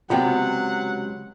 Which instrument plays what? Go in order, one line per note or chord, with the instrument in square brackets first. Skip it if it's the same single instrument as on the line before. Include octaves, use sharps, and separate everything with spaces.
[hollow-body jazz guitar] C#2 C3 B3 [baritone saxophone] F#3 [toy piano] F4 G5 [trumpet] F#5